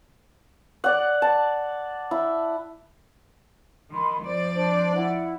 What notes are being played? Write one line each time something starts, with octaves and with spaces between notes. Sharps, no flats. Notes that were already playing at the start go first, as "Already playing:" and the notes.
D5 F#5
A5
E4
D#3 B5 C6
F2 C5 D5
D4 C5
E4 F#5